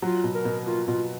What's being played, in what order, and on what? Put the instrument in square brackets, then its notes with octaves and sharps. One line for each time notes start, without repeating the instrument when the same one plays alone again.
[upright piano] F#3 [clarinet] F4
[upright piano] B2
[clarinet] A#4
[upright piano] B2
[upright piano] A#3 [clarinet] F4
[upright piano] B2 [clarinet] F4